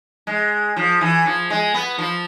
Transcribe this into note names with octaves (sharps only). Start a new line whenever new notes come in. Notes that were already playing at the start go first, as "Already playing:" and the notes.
G#3
F3
E3
F3
G#3
B3
F3